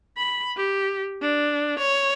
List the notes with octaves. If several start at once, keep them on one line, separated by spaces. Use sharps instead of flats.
B5
G4
D4
C#5